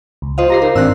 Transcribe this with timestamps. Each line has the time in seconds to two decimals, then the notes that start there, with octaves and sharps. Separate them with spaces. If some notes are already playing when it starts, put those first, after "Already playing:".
0.22 C#2
0.38 F4 C5 D#5 F5
0.50 G4 A#5 A#6 C7
0.62 D#4 A#4
0.76 G#1 C4 D4 E6 F#6